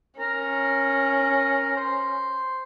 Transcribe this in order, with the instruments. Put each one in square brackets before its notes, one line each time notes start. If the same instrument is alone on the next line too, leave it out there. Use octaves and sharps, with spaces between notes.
[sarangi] C#4 [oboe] A#4
[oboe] C5